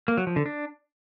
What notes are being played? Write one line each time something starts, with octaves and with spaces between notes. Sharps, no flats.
A#3
F#3
F3
D3
D4